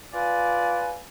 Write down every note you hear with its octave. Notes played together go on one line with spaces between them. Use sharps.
F4 B4 D5 G#5